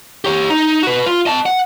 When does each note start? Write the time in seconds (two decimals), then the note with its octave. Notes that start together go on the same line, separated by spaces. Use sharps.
0.25 G4 C#5
0.50 D#4
0.83 F#4 B4
1.06 F4
1.26 D#5 A5
1.46 F#5